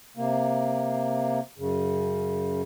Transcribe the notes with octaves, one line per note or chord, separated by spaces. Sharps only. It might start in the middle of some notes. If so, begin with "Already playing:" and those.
C3 A#3
F#2 C#3